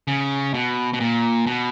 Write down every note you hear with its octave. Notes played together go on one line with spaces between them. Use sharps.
C#3
B2
B2
A#2
B2